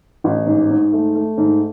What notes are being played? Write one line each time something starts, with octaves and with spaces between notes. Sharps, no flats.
A1
G#2
G#2
A3
A3
G#2